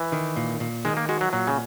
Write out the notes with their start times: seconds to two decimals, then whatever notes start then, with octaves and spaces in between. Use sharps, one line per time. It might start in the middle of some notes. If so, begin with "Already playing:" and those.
Already playing: E3
0.12 D#3
0.36 A#2
0.60 A#2
0.85 D#3 G#3
0.97 A#3
1.09 G#3 F#4
1.21 F#3
1.33 A#2 F#3
1.47 C#3